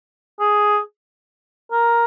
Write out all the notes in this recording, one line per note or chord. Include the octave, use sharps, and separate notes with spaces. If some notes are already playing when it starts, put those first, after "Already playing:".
G#4
A#4